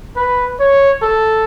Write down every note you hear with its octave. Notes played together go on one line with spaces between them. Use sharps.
B4
C#5
A4